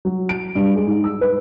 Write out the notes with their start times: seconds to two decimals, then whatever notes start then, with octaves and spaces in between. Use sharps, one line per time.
0.05 F#3
0.29 D7
0.55 G2
0.76 G#3
0.87 G#2
1.04 E6
1.21 B4